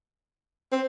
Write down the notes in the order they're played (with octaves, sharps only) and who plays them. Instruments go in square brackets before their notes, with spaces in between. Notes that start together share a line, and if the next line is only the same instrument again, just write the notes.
[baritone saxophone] C4